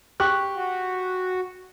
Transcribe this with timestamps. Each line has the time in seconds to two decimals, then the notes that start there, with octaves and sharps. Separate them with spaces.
0.20 G4 C#6 F#6
0.55 F#4